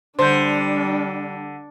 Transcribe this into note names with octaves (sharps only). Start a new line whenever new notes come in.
D3 G3 D4 C5 C6 G6